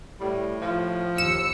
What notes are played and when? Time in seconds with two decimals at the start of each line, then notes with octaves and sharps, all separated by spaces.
0.20 A2 G3
0.61 F3
1.18 D#2 E6 C#7 E7